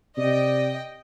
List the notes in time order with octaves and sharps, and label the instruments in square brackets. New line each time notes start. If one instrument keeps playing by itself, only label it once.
[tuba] C3 [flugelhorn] D5 [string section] D#5 G5